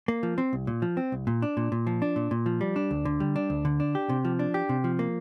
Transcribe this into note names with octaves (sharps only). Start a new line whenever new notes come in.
A#3
F3
C4
C2
A#2
F3
C4
C2
A#2
D4
A#2
A#2
F3
D4
A#2
A#2
F3
G3
D4
D2
D3
G3
D4
D2
D3
D4
G4
C3
F3
D4
G4
C3
F3
A#3